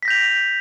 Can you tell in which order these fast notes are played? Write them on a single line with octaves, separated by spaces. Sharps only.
B6 A#6 G6 F7